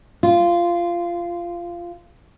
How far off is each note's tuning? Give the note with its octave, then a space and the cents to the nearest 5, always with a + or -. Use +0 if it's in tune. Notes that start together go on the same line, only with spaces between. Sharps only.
F4 -15